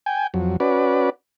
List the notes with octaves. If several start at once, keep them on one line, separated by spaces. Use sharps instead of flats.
G5 G#5
F2 F#3
C#4 F#4 B4 D5